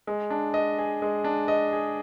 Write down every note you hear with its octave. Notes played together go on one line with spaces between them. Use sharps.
G#3
D4
D#5
G#4
G#3
D4
D#5
G#4